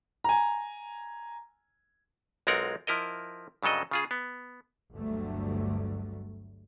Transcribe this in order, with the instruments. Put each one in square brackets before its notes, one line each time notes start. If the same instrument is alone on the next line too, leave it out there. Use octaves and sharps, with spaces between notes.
[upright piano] G#5 A#5
[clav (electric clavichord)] B1 G#3 C4 F4 A#4 F#5
F3 E4 A#4 D#5
G2 C#3 F#3 A4 D#5
C#3 F4 G#4
B3
[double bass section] G1 D2 D3 F#3 G3 A3